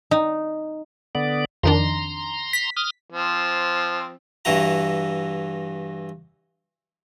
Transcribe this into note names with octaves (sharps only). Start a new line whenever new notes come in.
D#4
D3 B3 D5
F2 D#3 D4 A#5 C6
B6
D#6 F6
F3 C4
G2 E3 E4 F#4 A#5